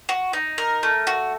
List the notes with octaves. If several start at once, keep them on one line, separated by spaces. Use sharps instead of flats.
F#4
D#4
A#4
A3
F#4